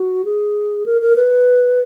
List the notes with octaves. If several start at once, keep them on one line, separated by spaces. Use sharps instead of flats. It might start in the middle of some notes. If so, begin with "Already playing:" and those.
Already playing: F#4
G#4
A#4
A#4
B4